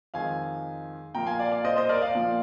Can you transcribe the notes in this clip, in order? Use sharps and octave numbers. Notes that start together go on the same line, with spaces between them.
F2 D#3 G#3 F5 G#5
A#2 F3 A#3 G5 A#5
F5 G#5
D5 F5
D5 F5
C5 D#5
C5 D#5
A#4 D5
D5 F5
A#2 F3 A#3